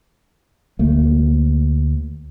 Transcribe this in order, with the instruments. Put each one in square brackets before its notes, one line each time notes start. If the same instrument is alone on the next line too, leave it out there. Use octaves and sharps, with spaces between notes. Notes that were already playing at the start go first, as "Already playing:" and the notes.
[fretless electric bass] D2 A3 A#3